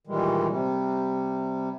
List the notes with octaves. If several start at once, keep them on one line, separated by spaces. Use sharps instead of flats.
A#2 D#3 E3 G3 G#3
C3 G3